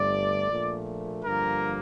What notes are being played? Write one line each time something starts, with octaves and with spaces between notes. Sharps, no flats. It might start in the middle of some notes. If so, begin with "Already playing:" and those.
Already playing: G1 G2 D3 A3 D5
A#1 A#2 A3
G2 D3 F3 A#3 A#4